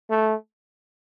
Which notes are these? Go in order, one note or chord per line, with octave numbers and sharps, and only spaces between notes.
A3